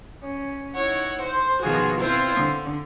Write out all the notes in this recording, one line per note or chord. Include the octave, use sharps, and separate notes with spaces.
C#4
D#4 E4 C#5 F#5
C5
B2 D#3 F3 F4 F#4 G#4
C4 E4 F4 C5
D3